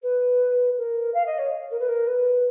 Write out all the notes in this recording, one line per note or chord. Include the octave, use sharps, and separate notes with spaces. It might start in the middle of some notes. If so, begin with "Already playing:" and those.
B4
A#4
F5
D#5
C#5
A#4
B4
A#4
B4